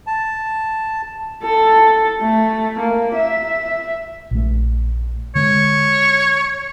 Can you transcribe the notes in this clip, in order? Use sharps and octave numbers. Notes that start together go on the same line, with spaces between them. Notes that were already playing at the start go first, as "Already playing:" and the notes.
A5
A4
A3
A#3
E5
A#1 A3
D3 G#3 C#5